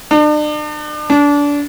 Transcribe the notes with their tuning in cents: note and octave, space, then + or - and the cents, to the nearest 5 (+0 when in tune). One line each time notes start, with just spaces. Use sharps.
D4 +40
D4 -25